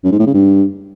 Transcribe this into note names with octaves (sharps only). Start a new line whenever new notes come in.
F#2
G#2
A2
C#3
G2